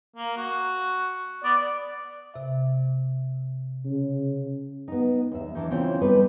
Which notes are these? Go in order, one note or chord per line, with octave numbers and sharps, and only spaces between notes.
A#3
F#4
B3 D5
C3 E5
C#3
B3 D#4
D#2 E5
D#3 E3 D4
C#3 E3 C4 C#4 F4
G3 B3 D#4 A4 B4